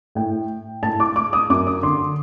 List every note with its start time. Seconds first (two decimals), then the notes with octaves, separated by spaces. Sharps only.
0.15 A2 G5
0.83 A2 A5
1.00 D6
1.16 D6
1.33 D#6
1.50 F#2 D6
1.67 D#6
1.83 D3 C6